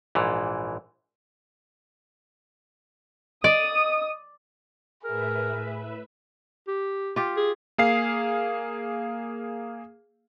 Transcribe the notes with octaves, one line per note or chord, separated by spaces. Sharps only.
A#1 G#2 E3
D5 D#5 D#6
A2 G#4 A#4 B4 E5
G4
F4 G4
G#4
A#3 G#4 F5 C7